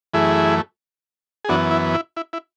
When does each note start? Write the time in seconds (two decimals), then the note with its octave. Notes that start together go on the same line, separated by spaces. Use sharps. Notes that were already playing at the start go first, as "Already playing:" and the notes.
0.14 F#2 E3 A3 E4 G#4
1.45 G#4
1.49 F#2 E3 B3 D4 F#4
1.71 E4
1.94 E4
2.17 E4
2.33 E4